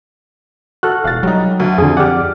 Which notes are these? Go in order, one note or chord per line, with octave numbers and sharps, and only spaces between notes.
F#4 A4 F6 F#6
E1 F5 A6
F#3 G3 D#4
D2
F2 D3 G#4
G4 D5 F#5 F6